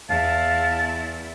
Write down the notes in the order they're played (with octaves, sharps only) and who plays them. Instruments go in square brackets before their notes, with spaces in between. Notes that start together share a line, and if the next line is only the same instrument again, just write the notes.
[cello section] E2 E4 [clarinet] F5 [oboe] A5